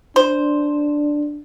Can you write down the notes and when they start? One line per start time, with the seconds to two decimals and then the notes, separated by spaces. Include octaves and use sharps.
0.16 D4 C5